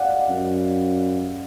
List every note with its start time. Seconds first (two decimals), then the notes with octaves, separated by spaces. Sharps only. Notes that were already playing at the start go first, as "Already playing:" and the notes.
Already playing: D5 F5 F#5
0.29 F#2